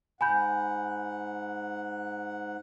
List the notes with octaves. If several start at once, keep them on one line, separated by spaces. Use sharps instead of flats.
G#2 F#5 G#5 B5 G6